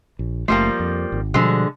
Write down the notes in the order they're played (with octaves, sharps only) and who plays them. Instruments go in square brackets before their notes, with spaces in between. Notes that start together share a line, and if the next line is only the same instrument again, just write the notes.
[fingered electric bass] A#1
[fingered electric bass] F#1 A3 [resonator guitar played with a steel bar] F3 G3 A#3
[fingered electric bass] F2
G#1
[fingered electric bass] B2 F3 G3 [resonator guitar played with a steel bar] D3 G#3